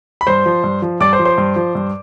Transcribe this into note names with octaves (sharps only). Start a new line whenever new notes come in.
B5
G2 C5 C6
F3
G2
F3
G2 D5 D6
C5 C6
F3
C5 C6
G2
F3
G2